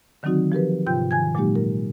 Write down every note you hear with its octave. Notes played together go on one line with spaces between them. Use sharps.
D3 D#3 F#3 C4 D#4 F#4
F3 G4 A#4 B4
G#2 C3 F4 G5 G6
D#3 G#5 G#6
A#2 F#3 G#3 A#3 D#4 G4
A#4